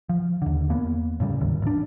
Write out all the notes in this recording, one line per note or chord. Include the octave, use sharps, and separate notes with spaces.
F3
D#2 D3
E2 A#3 B3
A2 C#3 G3
D1 G#1 D#2
A1 D4